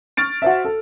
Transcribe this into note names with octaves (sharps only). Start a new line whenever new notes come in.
C#6 F6 A6 D7
F#4 C5 E5
A4